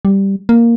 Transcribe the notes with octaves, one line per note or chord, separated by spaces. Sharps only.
G3
A#3